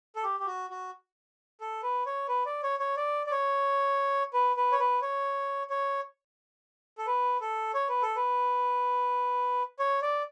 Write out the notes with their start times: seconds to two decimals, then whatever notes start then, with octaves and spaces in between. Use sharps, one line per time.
0.16 A4
0.24 G4
0.40 G4
0.46 F#4
0.70 F#4
1.61 A4
1.83 B4
2.06 C#5
2.28 B4
2.46 D5
2.63 C#5
2.80 C#5
2.97 D5
3.27 D5
3.31 C#5
4.33 B4
4.56 B4
4.72 C#5
4.79 B4
5.02 C#5
5.70 C#5
6.98 A4
7.07 B4
7.41 A4
7.74 C#5
7.89 B4
8.02 A4
8.16 B4
9.79 C#5
10.02 D5